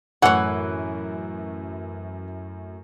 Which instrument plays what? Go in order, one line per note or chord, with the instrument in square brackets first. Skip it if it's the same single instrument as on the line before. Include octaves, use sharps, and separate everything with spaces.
[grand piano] F#2 A2 A3 [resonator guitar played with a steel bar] E3 G#5 [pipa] C#5 F#5